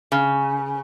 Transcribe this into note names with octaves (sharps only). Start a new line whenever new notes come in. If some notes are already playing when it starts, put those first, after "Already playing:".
C#3